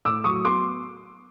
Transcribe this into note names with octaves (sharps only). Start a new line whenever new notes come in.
A2 D6 E6
F#3 C#6 D#6
B3 C6 D6